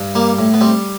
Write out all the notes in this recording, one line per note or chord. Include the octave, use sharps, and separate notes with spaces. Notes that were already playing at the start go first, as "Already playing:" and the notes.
Already playing: G2
G3 A#3
A2
B3
G3 C4